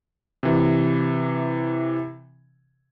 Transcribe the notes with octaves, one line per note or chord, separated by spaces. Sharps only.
C3 E3